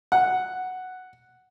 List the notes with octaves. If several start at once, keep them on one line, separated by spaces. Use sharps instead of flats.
F#5